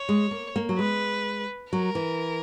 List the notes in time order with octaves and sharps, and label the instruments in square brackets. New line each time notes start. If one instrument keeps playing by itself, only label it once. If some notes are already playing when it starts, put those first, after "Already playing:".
Already playing: [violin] C#5
[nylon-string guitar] G#3
A#3
A#3
F#3
[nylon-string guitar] G#3 [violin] B4
[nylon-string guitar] F#3 [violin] A#4
[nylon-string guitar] E3